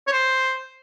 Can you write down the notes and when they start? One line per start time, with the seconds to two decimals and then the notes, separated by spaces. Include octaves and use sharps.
0.07 C#5
0.12 C5